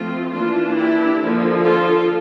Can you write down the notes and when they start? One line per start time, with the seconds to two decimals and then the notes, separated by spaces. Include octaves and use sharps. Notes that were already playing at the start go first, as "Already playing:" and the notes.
Already playing: F3 A3 C4 F4
0.32 E3 A#3 D4 F4
0.76 E4 G4
1.20 D3 F3 A#3
1.63 F4 A4